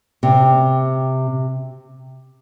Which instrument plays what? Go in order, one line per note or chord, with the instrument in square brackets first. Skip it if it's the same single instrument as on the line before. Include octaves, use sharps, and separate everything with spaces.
[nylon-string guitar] C3